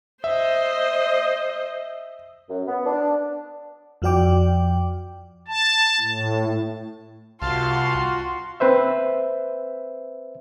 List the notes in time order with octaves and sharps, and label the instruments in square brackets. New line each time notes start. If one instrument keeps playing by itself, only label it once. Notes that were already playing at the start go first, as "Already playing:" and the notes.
[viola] C5 D#5 [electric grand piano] E5
[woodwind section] F#2
B3
D4
[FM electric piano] F2 F3 F#4 D5 G5 D6
[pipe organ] A5
A2
[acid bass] C2 [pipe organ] F4 F#4 [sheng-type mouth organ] F5 A5 F6 [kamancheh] C6
[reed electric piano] C4 B4 C5 E5